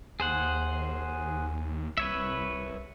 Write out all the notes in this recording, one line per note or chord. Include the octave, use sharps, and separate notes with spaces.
D#2 G#4 C5 F#5
C2 B4 C#5 E5